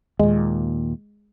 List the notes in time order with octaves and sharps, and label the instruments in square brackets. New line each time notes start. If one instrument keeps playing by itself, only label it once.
[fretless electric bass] D#2 A#2 [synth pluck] G#3